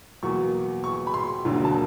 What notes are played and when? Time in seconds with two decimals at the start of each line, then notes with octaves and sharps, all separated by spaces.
0.23 E2 B2 F#3 A#3 C#6
0.84 C#6
1.07 B5
1.14 C6
1.45 E1 D2 D3 F#3 A#3
1.65 A5